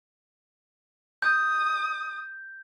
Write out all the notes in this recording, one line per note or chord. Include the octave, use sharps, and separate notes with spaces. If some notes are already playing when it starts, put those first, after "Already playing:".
D#6 G6